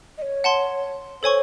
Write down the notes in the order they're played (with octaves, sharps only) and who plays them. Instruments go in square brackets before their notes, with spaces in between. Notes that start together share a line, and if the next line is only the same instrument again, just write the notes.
[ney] D#5
C#5
[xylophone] F#5 A5 C6
[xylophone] A4 C#5 G#5 C#6 [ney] C5